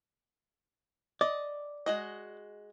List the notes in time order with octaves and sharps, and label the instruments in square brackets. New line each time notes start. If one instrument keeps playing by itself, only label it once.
[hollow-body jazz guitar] D5 [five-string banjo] D#5
[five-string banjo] G#3 F#4 D#5